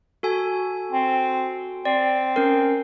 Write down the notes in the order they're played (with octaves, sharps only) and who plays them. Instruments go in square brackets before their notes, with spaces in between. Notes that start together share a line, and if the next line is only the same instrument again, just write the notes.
[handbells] F#4 A4 G#5
[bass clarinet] C4
[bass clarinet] C4 [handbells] D5
[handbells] C#4 A#4